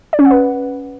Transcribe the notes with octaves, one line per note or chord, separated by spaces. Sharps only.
D5
C#4
F#5
B4